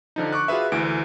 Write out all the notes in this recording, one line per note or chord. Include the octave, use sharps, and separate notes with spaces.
D3 F3 D#4
C#6 D6 F#6
F4 F#4 G#4 B4 E5
D2 E3 D7